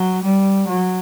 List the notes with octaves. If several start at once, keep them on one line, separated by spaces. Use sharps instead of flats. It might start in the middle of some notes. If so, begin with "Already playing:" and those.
Already playing: F#3
G3
F#3